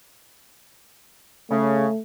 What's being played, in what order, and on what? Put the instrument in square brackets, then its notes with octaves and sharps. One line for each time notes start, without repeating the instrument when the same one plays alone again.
[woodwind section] C#3 [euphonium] A3